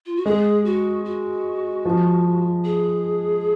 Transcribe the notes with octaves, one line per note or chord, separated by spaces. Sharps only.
F4
F#4
G#3 G#4
F#4
F#4
F3
G#4